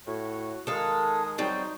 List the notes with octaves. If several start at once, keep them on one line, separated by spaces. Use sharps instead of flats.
A2 F#4 C#5
D#3 G#3 A4 F5 D#6
F#3 G3 C4 D#4